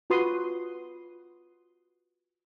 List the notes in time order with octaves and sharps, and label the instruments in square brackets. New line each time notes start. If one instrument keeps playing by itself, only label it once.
[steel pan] F4 F#4 B4 C6 D#6